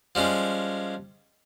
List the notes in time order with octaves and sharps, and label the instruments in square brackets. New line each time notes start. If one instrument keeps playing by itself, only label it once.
[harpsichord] F3 G3 G#3 C#4